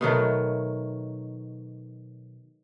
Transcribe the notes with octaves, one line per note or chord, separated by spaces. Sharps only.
B2 D#3 F#3 A3